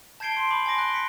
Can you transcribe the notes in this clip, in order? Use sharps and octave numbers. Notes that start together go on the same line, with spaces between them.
A5 G6 G#6 C7 D7 G7
C6
B5 D6 F#7
G#5 C6 D6 A#6 D7
F#6 G7
B6 C#7